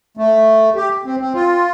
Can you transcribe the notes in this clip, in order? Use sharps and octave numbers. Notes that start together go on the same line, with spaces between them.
A3
G4
C4
C4
F4